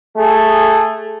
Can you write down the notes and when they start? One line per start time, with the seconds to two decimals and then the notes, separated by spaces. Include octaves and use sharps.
0.17 A3 G#4